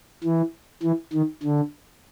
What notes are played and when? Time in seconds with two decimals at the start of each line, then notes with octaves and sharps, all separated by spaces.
0.24 E3
0.83 E3
1.13 D#3
1.43 D3